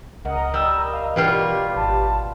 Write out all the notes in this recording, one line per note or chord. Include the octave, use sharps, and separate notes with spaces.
C#2 A#4 D#5 F#5
G3 E6
F5
B2 E3 G3 F4 G4 A#4 B4
G#1 A5